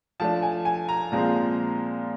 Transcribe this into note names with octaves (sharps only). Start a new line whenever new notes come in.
F3 A3 D4 A5
G#5
G#5
A#5
A#2 F3 G#3 C4